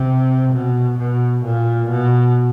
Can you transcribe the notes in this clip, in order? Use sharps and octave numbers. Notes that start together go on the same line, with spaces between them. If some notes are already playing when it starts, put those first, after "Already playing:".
Already playing: C3
B2
B2
A#2
B2